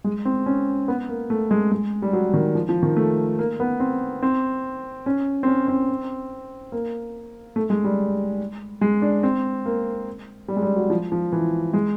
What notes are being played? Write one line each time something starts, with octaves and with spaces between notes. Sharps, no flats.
G#3
C4
C#4
B3
A#3
A3
G#3
G#3
G3
F#3
D#3
F3
F3
D#3
A3
A#3
B3
C4
C4
C#4
C4
C#4
C4
A#3
A3
G#3
G3
G#3
D4
C4
A#3
G3
G#3
G3
F#3
F3
F3
E3
G#3